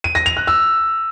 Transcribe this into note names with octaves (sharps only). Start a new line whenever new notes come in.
D#7
A#6
F7
F#6
E6